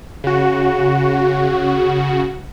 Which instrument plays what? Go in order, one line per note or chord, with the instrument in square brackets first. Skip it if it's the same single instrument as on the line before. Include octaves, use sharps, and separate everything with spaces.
[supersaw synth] C#3 F#4